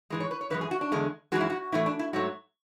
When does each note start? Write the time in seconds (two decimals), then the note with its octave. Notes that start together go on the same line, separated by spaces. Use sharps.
0.10 G#2 E3 G#3
0.20 C#5
0.31 B4
0.41 C#5
0.50 F#2 E3 G#3 B4
0.61 G#4
0.71 F#4
0.81 D4
0.92 E2 D3 G#3
1.32 F#2 E3 G#3 F#4
1.41 E4
1.50 F#4
1.72 A2 E3 A3 E4
1.86 D4
1.99 E4
2.13 G#2 F#3 A3 F#4